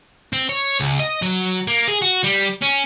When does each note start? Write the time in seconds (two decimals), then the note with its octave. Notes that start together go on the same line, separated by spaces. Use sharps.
0.33 C4
0.49 C#5
0.80 C#2
1.00 D#5
1.22 F#3
1.68 A#3
1.88 G#4
2.02 F#4
2.24 G3
2.62 C#4